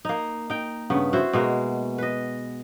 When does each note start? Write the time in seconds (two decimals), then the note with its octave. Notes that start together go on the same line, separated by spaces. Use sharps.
0.05 A#3 D#4
0.50 D#4 G5
0.90 G2 C#3 B3
1.13 E4 F#4 C5
1.33 B2 G#3 A#3
1.98 B4 D#5